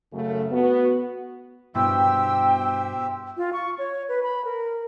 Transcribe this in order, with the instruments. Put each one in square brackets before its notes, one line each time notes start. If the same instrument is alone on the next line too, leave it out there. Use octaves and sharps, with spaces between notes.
[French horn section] F#2 C#3 A3
B3 F#4
[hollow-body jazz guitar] G2 B2 E4 [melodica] G4 C5 E5 [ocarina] G5 [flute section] E6
[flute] F4
C#6
C#5
B4
B5
A#4